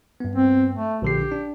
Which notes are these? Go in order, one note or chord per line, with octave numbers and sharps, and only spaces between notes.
G2 B3
C4
A3
A#1 D3 G4 C7
D4